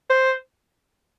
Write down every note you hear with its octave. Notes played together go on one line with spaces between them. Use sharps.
C5